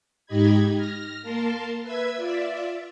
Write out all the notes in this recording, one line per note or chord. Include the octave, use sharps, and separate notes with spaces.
G#2 D#4 G4 D#5 B5 G#6
F6 A#6
A#3 A#4 A5 C6
B4 E5 E6 G#6
F4 D5 E5